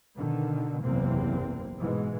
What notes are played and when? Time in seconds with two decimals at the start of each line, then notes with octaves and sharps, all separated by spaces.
0.16 B2 D3 D#3
0.83 F#1 B1 E2 C3 A#3 C4
1.79 G#2 B2 E3 G#3